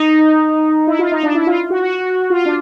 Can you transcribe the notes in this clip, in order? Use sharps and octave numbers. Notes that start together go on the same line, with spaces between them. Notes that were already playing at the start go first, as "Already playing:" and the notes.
Already playing: D#4
E4
F4
D#4
D4
E4
F4
F#4
F#4
F4
D4